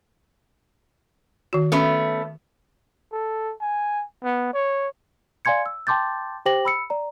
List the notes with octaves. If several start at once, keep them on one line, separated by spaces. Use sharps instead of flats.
D#3 F#4
A3 B3 C#4
A4
G#5
B3
C#5
D5 F5 G#5 C6 G#6 C#7
E6
G5 A5 C6 D6 G6 A6
G4 C5 G5 D6 A#6 F#7
B5 E6 C#7
D5 A#5